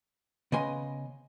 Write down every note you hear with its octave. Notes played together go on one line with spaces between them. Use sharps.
C#3 B3 D#5 G#5 C6